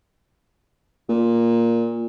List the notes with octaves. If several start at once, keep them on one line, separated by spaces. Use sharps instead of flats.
A#2